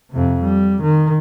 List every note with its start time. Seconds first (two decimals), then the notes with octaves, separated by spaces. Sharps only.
0.11 F2 C3
0.43 G3
0.83 D#3